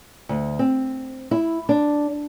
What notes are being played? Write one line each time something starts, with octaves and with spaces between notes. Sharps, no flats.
D2
C4
E4
D4